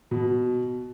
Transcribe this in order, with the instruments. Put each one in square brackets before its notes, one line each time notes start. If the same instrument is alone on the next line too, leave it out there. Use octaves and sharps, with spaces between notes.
[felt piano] B2